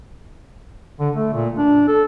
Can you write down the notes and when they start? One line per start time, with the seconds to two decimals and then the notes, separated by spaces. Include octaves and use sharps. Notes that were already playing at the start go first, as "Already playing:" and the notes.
1.00 D3
1.15 A3
1.33 A#2
1.58 D4
1.88 A4